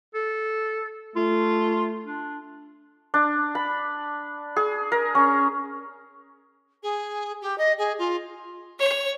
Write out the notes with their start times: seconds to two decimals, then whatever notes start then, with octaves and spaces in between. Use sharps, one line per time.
0.14 A4
1.16 A3 F4
2.05 D4
3.14 D4
3.55 B5
4.56 G#4
4.92 A#4
5.15 C#4
6.82 G#4
7.41 G4
7.57 D#5
7.78 G#4
7.98 F4
8.79 C#5